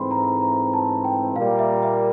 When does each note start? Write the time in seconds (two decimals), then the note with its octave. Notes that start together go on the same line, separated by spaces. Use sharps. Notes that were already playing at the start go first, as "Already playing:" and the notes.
Already playing: G#2 E3 A3 C4 B5 C6
0.11 A#5
0.42 A#5
0.73 A5
1.04 G5
1.36 A#2 G3 A#3 F5
1.59 E5
1.83 E5